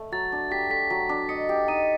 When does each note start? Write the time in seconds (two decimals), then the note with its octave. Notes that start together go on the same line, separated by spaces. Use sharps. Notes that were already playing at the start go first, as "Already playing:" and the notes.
Already playing: A3
0.12 F#3 A6
0.32 D4
0.51 G4 B6
0.70 A3 B6
0.90 F#3
1.09 D4
1.29 D#5 C#7
1.49 G4
1.68 D#4 D#7